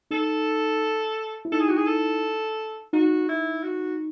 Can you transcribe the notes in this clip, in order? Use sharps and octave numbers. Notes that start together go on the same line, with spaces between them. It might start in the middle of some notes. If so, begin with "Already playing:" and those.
D#4 A4
E4
D#4 A4
G#4
F#4
G#4
A4
D#4 F#4
E4
F#4